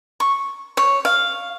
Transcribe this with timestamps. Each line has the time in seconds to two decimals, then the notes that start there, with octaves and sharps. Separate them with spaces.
0.20 C#6
0.77 C#5
1.05 F5